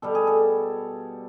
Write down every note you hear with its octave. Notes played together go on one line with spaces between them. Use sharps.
B2 G3 A4
G#4
A4